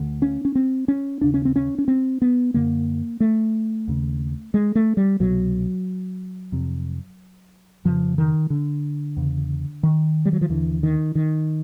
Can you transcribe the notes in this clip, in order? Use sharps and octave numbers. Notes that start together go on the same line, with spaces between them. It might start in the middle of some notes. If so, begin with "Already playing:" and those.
Already playing: D2 D3
C#4
C#4
C4
C#4
D#2 C#3 D4
C#4
C4
C#4
C#4
C4
B3
F#2 D3 A#3
A3
D#2 C#3
G#3
A3
G3
C2 B2 F#3
F2 C3
F2 C#3 F3
D#3
D3
E2 C#3
D#3
G3
F#3
F3
D#2 D3 E3
D#3
D#3